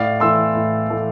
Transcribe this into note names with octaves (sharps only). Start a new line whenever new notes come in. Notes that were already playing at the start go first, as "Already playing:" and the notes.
Already playing: A2 D5 F5
E3 A3 C6 E6
A2
E3 A3